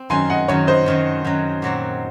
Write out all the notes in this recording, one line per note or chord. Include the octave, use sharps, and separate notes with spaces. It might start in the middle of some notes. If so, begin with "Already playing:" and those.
Already playing: C4
F#2 D#3 F#3 G#5 C6
D#5 F#5
F#2 D#3 F#3 C#5
C5 D#5
F#2 D#3 F#3
F#2 D#3 F#3
A#2 F#3 C4 F#4